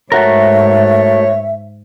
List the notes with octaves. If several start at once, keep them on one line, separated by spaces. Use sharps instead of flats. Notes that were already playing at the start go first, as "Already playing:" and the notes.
G#2 A3 F#4 A#4 C#5 E5